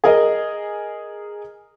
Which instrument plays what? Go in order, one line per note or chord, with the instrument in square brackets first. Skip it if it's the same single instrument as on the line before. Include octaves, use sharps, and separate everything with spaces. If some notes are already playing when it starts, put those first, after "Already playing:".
[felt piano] G#4 A#4 D#5